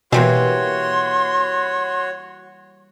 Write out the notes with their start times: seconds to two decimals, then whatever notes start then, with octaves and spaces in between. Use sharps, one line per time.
0.12 B2 E3 G3 A#3 F#4 C#5 C6